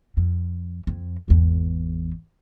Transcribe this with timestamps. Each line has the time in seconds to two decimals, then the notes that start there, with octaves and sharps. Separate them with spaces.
0.17 F2
0.87 F2
1.28 G#1 E2